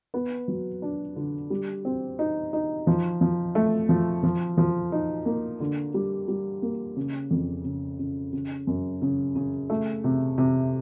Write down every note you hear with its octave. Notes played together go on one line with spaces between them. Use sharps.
B3
F#3
D4
D3
G3
C4
D#4
D#4
F3
F3
A3
F3
F3
F3
D#4
A#3
D3
G3
G3
A#3
C#3
F2
C#3
C#3
C#3
F#2
C#3
C#3
A3
C3
C3